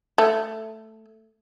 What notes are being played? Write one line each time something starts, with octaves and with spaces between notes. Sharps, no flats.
A3